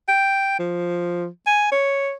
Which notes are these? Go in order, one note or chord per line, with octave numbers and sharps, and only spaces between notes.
G5
F3
G#5
C#5